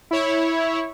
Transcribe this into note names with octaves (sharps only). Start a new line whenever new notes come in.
E4 C#5